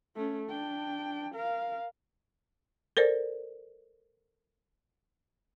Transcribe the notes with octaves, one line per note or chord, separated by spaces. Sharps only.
A3 C#4
D4 G5
A#4 F5
A4 A#4 C5 D5